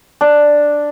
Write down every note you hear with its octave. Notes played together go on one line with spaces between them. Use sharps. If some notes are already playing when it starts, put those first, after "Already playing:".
D4